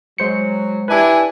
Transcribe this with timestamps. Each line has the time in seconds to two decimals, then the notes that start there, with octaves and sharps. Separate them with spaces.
0.18 F#3 G#3 C5 C#7
0.88 D4 E4 G4 B4 G#5